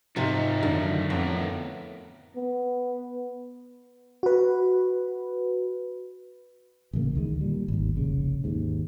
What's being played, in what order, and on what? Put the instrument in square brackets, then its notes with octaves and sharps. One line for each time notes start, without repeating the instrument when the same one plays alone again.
[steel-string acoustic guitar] G#2 C3 [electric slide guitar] A3 F4 [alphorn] D#4
[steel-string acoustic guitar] F#2 [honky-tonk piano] D3 D#3
[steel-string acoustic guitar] F2 [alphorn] A2 [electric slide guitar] B3 A#4 B4
[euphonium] B3
[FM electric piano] F#4 B4
[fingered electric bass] A1 C#3 F#3 A#3
D2 D#3 G#3
A#2 G3
G#1 D#2
F1 A#1 C#3
D#2 G#2